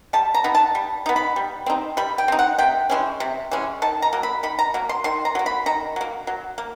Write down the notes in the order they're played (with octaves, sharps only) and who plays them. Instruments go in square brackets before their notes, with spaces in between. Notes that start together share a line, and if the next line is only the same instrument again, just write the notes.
[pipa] G3 A5
A#5
B3 D#4
A5
G3
B3 D#4
B5
G3
C4 D#4
G3 B5
G5
C4 D#4
F#5
C3 G5
E3 G#3 C#4
C3
E3 G#3 C#4
D#3 A5
A#5
F#3 A#3
B5
D#3 B5
A#5
F#3 A#3
C6
D#3 C6
A#5
F#3 A#3
B5
D#3 A#5
F#3 A#3
F#3
A#3